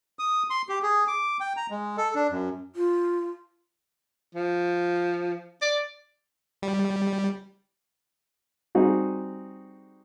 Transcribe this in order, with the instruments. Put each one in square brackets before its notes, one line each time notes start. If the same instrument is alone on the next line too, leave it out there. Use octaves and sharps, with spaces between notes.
[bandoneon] D#6
C6
G4
G#4
D6
G5
A#5
G#3
A4
D4
F#2
[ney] F4
[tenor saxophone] F3
D5
[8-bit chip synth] G3
[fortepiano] G3 C4 D#4 F#4 G#4